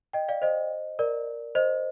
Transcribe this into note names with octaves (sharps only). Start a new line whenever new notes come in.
D#5 G5
D5 F5
C5 D#5
A#4 D5
C5 D#5